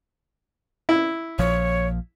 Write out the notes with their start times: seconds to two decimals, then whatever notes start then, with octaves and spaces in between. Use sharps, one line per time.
0.89 E4
1.39 A#1 A#2 F3 C#5